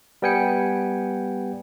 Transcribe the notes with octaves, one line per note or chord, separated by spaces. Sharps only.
G3 B3 G5 G#5 C#7